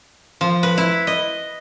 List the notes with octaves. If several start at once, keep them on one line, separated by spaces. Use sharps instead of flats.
F3
B4
E4
D#5